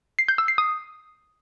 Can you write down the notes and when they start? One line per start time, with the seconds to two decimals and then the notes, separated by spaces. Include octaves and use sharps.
0.19 C7
0.28 G6
0.38 E6
0.48 C7
0.58 D#6